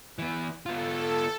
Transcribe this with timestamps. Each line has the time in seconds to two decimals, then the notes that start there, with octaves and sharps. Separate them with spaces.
0.19 E3 B3
0.66 B3 F4 A4